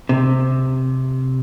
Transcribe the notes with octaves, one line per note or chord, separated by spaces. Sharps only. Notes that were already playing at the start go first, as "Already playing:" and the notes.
C3